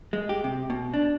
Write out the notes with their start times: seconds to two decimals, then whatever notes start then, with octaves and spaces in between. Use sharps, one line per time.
0.13 G#3
0.29 G4
0.44 C3
0.70 B2
0.94 D4